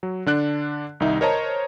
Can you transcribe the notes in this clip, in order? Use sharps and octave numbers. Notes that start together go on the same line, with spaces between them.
F#3
D3 D4 F#6
C2 D#3 D#4 E5
A#4 C5 C#5 D#5 A5 A#5